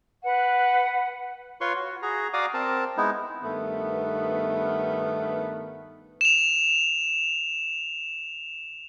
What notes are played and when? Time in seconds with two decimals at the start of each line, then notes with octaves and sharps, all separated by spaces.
0.23 B4 F#5
1.61 F4 B4 C#5 C6 C#6
1.76 F#4
2.02 F#4 G#4 A#5
2.34 F#4 D5 F5 A#5 D6 D#6
2.54 C4 A#4 A5
2.97 G#3 B3 D#4 E4
3.43 G2 D#3 A3 B3
6.21 E7 F7